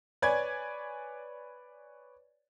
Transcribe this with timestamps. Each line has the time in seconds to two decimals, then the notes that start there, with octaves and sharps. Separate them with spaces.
0.22 B4 C#5 D5 G#5 G#6